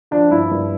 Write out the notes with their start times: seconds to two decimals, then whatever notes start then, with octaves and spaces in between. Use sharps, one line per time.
0.11 F3 D4
0.31 G2 E4
0.51 G2